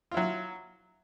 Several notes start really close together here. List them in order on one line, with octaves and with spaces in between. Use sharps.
F4 E4 F#3